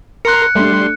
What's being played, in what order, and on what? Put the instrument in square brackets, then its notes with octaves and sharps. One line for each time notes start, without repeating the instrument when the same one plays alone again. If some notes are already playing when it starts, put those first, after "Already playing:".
[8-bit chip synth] A#4 A#5 C6 [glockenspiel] F#6 C#7
[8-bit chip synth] G3 C6 [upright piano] A3 D4